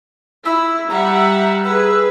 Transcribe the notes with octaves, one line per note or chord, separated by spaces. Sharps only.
E4 E6
G3 E5 F#5 A#5
G#4 B4 E6